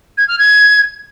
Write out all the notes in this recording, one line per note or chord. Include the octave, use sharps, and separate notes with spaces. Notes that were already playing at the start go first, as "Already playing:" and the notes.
G#6
F6
G#6